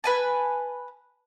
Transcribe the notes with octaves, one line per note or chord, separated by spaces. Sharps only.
B4 G#5 A5